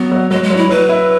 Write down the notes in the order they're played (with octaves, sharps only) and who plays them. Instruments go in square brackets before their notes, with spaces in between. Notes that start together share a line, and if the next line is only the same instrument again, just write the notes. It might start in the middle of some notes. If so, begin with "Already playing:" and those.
Already playing: [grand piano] F#3 [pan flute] B3
[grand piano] F#3
[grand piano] F#3 [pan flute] G#3
[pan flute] G#3
[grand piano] F#3
[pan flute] E4
[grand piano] F#3 [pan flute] B4
[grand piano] E4